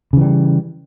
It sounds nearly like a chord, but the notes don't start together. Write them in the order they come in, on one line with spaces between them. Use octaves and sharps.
C#3 E3 G3